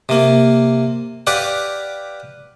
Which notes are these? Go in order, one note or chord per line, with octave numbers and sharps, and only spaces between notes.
C3 A#3
G4 B4 D5 F5 F#5